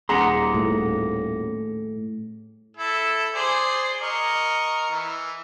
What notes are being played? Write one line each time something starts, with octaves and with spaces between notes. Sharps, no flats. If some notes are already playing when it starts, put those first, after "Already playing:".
D#1 G#4 F#5 A#5 C6 A#6 C#7
A2
E4 A4
G#4 C5 D5
A#4 D#5 C#6
E3